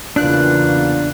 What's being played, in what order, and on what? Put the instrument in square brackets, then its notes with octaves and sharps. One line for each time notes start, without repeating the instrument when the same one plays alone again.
[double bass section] E2 C#3 E3 [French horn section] A#3 B3 F4 [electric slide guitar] D4 [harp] F#6